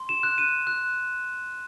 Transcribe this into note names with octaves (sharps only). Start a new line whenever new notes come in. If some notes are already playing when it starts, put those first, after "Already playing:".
Already playing: C6
E7
F#6
D#7
F#6